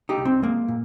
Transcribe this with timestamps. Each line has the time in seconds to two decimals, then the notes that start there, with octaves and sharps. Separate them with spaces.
0.09 D#4 G4
0.18 C2
0.25 C4
0.42 G#3 A#3
0.68 A#2